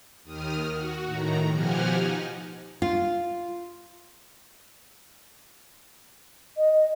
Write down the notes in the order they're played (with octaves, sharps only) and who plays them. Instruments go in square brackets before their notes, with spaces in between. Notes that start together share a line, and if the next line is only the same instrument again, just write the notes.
[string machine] D#2 D#3 D#6 F6
F#4
A2 D#3 A#5
B2 F3 G4 F#5 G#5 F6
D#4
[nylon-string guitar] F4
[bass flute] D#5